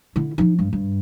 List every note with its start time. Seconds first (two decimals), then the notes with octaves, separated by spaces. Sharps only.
0.16 D3 E4
0.38 F3 D#4
0.59 G2
0.73 G2